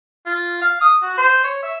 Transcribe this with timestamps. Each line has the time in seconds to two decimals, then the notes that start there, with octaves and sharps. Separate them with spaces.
0.26 F4
0.62 F5
0.81 D#6
1.02 F#4
1.18 C5
1.44 C#5
1.63 E5